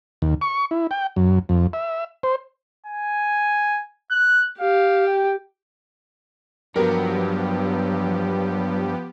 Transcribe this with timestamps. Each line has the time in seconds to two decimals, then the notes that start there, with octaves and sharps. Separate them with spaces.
0.22 D#2
0.41 C#6
0.71 E4
0.91 G5
1.16 F#2
1.49 F2
1.73 E5
2.23 C5
2.86 G#5
4.10 F#6
4.60 G4 F5
5.06 G5
6.76 G2 F3 F#3 B3 G4 A#4